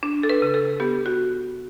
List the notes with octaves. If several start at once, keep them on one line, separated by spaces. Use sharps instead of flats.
D4
A4
B4
C#3
A4
B3 G4
F#4